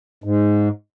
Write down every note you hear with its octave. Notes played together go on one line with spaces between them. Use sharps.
G#2